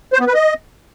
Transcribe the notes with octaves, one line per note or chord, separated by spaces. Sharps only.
C5
B3
B4
D#5